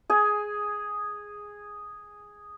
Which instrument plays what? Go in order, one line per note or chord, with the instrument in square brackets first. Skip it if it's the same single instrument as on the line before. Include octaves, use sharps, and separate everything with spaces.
[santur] G#4 G#5